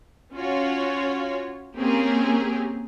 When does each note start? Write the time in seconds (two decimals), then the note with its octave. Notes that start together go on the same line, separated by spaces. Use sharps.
0.33 C#4 F4 F#4 C#5
1.76 A#3 C4 C#4 G4 G#4 A#4